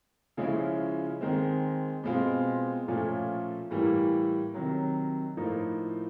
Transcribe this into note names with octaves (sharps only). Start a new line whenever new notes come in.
C#3 F3 G#3 C#4 E4
D#3 G#3 C4
B2 G#3 C4 F4
A#2 F3 A3 C#4 F4
A2 E3 G3 A#3
C3 D#3 F#3
A2 F3 A#3 D#4